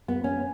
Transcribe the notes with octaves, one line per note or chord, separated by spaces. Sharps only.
B3
C#4